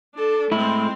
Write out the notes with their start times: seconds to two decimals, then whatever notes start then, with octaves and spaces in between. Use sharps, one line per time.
0.15 D4 A4
0.52 A2 G#3 C4 E4